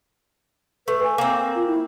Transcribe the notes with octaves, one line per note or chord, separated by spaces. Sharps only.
A3 B4
G#5
A#3 C4
F4
E4